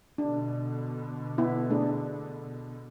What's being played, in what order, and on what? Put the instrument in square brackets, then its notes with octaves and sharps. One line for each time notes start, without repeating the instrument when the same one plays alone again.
[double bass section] B2 D3 [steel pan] D4
[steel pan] B3 E4
A3 D4 G#4